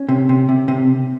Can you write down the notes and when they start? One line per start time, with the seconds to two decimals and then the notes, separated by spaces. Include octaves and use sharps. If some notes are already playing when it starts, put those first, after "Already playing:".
Already playing: C#4
0.09 C3
0.29 C3
0.49 C3
0.68 C3